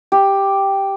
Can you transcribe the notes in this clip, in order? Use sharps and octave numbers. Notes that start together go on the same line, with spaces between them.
G4